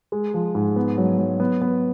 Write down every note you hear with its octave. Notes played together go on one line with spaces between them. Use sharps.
G#3
F3
G#2
B3
F#3
F#3
B3
B3